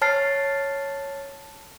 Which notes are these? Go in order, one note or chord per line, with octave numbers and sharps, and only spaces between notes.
C#5 A5 F6 A6 C7